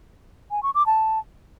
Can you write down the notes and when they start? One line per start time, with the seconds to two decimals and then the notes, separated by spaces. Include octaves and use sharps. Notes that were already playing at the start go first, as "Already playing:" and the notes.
0.51 G#5
0.63 C#6
0.75 D6
0.86 A5